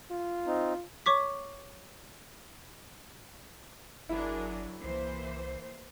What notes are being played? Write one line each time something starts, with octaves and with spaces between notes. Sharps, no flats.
F4
C4 D#4
C#5 C#6 D6 B6
G1 F#3 D4 E4 G#4 A#4
C2 E3 A#3 C5